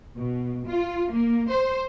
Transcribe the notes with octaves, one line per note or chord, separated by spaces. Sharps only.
B2
F4
A#3
C5